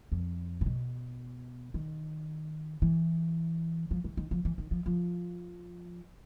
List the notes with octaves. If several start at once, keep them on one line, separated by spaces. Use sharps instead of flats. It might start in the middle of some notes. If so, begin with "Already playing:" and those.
F2
A#2
B2
D#3
E3
F3
E3
D#3
F3
E3
D#3
F3
F3